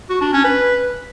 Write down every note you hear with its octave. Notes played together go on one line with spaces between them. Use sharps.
F#4
D4
C#4
B4